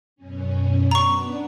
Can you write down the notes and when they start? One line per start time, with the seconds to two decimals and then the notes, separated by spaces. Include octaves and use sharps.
0.16 F#2 B2 C#4
0.91 B3 D4 A#5 C#6